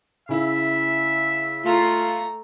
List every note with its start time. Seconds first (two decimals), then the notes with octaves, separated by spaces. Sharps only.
0.29 C#3 E4 E5
1.64 A3 F4 A#5